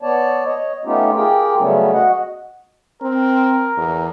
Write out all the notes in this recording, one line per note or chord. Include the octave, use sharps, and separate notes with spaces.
B3 C#5 D5 A5
C#5 D#5
A3 B3 C#4 D#4 F4 G4
F4 G4 G#4 A#4 G5
C#3 F#3 G3 A3 B3 C#4
F#4 D#5 F#5
C4 A#4
E2